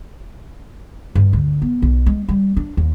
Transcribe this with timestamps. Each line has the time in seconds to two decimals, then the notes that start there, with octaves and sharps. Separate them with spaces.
1.15 G2
1.33 D2
1.62 B3
1.82 B1
2.06 G#3
2.28 G3
2.57 D4
2.77 D#2